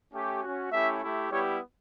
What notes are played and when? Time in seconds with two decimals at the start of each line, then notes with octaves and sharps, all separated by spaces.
0.13 A3 C#4 G4
0.42 C#4 F#4
0.71 A3 C#4 E4 G4 E5
1.01 A3 E4 G4
1.31 G3 B3 E4 G4 C#5